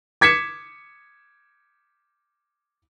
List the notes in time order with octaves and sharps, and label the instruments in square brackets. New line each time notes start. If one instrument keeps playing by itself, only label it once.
[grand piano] D6 G#6 B6 C#7 E7